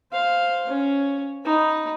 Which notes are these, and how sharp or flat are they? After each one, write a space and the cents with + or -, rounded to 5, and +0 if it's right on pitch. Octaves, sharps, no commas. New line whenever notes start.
C5 +0 F5 +0
C#4 +5 C#5 +0
D#4 +0 B5 -10